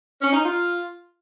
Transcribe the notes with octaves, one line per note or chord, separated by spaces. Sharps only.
C#4
D#4
F4